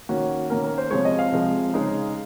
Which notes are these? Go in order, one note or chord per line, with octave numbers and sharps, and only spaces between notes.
D#3 A#3 C#4 F#4
D#3 A#3 C#4 A#4
A#4
C5
C3 F3 G#3 C#5
D#5
F5
C3 F3 G#3
C#3 G#3 D#4